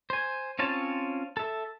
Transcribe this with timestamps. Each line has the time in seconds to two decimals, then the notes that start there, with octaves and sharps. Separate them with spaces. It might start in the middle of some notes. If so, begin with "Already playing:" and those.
0.10 C5 G#5
0.59 C4 C#4 F4 C#5 A5
1.37 A4 E5